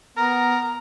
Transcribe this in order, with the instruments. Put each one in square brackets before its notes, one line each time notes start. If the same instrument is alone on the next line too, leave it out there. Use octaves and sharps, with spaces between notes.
[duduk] B3 [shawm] A#4 [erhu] A#5